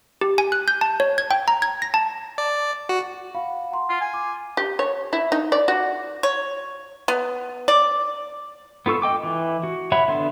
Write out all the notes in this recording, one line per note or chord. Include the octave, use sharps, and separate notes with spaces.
G4
G#5
F#6
G6
A5
C#5
G#6
G5
A#5
G#6
A#6
A5
D5
F#4
F5 F#5 B5
F#5 A#5 C6
F4
G#5
D6
G4
C#5
E4
D#4
D5
F#4
C#5
B3
D5
B3 F4 A4 C#6 E6
D#5 G5 D6
E3
F#4
C#5 E5 F#5 B5
D3 B3 E5 C6